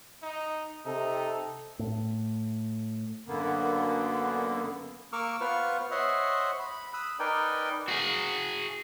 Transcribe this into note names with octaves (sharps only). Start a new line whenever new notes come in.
D#4
C3 D#4 A4
A2
F#2 D3 A#3 B3
A#3 A#4 C#6 D6 E6 F6
B3 F4 B4 C5 C#6 F6
C5 C#5 D#5 E5 F#5 C6
B5
B5 D#6 E6 F#6
D#4 A#4 B4 D5 G5 G#5
F#4 G#4